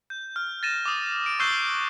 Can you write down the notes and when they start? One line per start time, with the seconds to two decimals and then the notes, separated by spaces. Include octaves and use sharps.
0.10 G6
0.36 F6
0.63 A6 A#6 D#7 E7
0.86 D6 D#6
1.26 D7
1.39 C#6 E6 F#6 G6 C7 G7